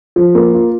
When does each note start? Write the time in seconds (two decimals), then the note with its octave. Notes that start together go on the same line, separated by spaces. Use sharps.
0.16 F3
0.35 A#3
0.54 F4